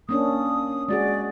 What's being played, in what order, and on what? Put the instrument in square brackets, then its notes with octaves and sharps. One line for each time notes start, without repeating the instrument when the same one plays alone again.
[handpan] A#3 C#4 D4 [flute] D#6
[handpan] G#3 F#4 G#4 [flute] D5